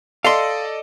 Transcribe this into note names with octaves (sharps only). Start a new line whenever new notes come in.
A4 D5 D#5 F5 C6